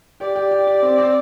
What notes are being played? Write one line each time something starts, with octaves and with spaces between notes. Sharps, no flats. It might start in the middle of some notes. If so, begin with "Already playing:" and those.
G4 D5
G4
G4
G4
C4
C4